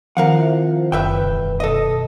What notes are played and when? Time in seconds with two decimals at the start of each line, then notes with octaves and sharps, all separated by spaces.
0.17 D#3 F3 C4 A#4 F5 F#5
0.37 E4 E5
0.92 F#1 F#2 B4 E5 G5
1.22 E1
1.60 B2 A4 D#5 A#6